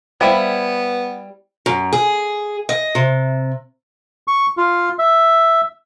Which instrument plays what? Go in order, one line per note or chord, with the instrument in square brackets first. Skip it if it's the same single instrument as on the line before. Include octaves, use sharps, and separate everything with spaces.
[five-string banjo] G3 E4 [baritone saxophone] B3 [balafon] C5 F5 G5
[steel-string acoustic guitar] F#2
G#4
D#5
C3
[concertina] C#6
F4
E5